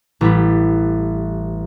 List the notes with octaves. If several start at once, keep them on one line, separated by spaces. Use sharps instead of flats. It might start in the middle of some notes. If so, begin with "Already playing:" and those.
A1 G3 B5